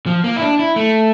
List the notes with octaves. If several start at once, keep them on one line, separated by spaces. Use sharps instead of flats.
F3
A#3
E4
D4
E4
A3